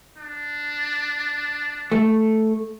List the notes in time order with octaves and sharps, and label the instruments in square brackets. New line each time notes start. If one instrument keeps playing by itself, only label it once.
[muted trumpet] D4
[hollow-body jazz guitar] A3